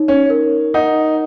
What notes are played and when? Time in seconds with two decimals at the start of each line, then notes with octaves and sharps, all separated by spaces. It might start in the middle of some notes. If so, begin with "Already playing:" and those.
Already playing: D#4 C#5
0.08 C#4
0.30 A#4
0.74 D#4 F#5